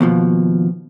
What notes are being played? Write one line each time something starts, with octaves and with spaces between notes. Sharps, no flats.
D#2 B2 F3